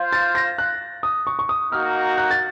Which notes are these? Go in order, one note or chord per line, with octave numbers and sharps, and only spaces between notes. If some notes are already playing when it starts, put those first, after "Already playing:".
Already playing: F4 C5 F5
A6
A#6
F#6
D#6
C#6
C#6
D#6
A#3 D#4 F#4 F6
F#6
A6